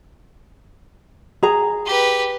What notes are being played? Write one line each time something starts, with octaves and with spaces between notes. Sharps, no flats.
G#4 A#5
G4 B4